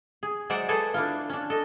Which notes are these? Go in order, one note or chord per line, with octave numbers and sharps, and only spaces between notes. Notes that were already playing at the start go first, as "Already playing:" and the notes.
G#4
F#3 G#3 C5 D5 E5 F#5
G#4 A4 B4 G#5 A5
D4 E4 F4
C#4 D4
A4 D#5